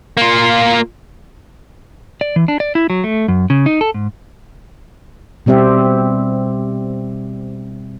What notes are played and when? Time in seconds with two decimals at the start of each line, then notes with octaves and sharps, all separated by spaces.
0.17 A#3 F4
2.21 D5
2.36 E3
2.48 D4
2.60 D5
2.75 E4
2.90 F#3
3.04 A3
3.28 F#2
3.50 C#3
3.66 D#4
3.81 A4
3.94 G#2
5.46 B2 G3 C4 G4 E5